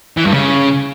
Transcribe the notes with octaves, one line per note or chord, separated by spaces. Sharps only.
E3
G2
C#3